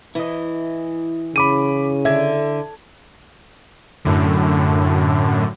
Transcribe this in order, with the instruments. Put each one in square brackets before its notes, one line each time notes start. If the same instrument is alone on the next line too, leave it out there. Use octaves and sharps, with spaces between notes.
[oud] E3 [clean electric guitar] E4 D#5
[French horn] C#3 [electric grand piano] B5 D6 D#7
[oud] D3 [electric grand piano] E5 G#6
[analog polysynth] F#2 A2 D3